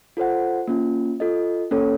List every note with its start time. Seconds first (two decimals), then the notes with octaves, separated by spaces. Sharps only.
0.17 F4 A4 C5 F#5
0.68 A#3 C#4 F4
1.20 F4 A4 D#5
1.71 A#3 C#4 A4 C#5